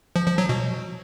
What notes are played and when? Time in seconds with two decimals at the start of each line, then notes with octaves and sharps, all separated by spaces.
0.16 F3
0.27 F3
0.38 F#3
0.49 B2